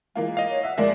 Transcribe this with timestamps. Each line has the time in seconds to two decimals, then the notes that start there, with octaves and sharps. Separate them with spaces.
0.15 E3 G#3 A#3 F4
0.37 D#5 F5
0.49 C#5
0.63 E5 F#5
0.78 F2 G#3 A#3 D5 E5